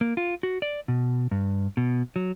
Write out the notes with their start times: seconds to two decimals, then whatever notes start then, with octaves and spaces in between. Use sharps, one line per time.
0.01 A#3
0.17 F4
0.43 F#4
0.62 D5
0.88 B2
1.31 G2
1.77 B2
2.16 F#3